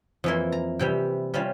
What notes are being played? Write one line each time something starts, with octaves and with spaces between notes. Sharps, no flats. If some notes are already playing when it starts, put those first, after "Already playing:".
F2 E3 A#3 E4 C6
A#5
C3 E3 G3 G5
C3 G3 C#4 F4